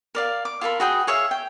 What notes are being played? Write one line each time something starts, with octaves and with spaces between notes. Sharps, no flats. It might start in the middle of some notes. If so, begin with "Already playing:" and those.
A#4 D5 F5
D6
F4 A4 A#4 B5
F#4 G#4 G5
G#4 C#5 E5 F5
G5